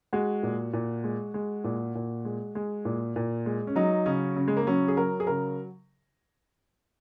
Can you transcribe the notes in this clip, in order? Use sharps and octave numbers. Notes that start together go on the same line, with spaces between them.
G#3 F#4
A#2
A#2
G#3
G#3
A#2
A#2
G#3
G#3
A#2
A#2
G#3
C#4
F#3 D#4
C#3 C#4
C#3
G#3
A#3
F#3 C#4
G#4
F#3 A#4
G#4
C#3 A#4